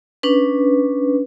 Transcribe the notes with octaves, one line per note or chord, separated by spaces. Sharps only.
C#4 D4 B4